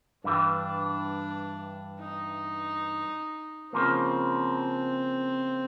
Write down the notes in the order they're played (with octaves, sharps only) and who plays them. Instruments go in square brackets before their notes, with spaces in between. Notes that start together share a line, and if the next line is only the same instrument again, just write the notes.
[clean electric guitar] G2 E3 G3 [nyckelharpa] D4
[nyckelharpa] D#4
[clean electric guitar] C#3 F3 A#3 [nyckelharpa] C4